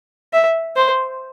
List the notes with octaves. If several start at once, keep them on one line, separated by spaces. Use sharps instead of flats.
E5
C5